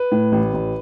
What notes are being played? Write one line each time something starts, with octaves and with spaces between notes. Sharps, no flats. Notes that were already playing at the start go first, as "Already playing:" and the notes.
Already playing: B4
A2
A1
A1